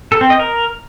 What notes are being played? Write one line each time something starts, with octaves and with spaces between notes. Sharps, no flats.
A4
C4
D#5
A#4